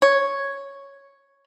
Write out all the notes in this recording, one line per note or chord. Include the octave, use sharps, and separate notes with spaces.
C#5